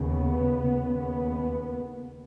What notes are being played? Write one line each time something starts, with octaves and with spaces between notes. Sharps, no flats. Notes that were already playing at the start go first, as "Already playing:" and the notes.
Already playing: D#2 C#3 B3
D#2 C#3
B3